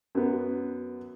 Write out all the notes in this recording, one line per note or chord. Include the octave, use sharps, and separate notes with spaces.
F#2 B3